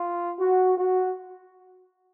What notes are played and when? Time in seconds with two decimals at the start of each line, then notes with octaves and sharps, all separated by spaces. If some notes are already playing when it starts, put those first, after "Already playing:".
Already playing: F4
0.40 F#4
0.76 F#4